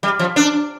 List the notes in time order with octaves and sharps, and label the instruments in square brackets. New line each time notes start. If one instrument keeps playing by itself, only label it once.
[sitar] G3
F3
D4